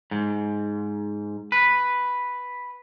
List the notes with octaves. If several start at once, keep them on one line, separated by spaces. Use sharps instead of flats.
G#2
B4